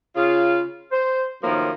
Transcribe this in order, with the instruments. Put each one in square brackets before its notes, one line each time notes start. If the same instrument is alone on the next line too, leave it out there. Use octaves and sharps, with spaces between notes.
[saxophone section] C#3 F4
C5
F#2 A2 D#3 F3 A#3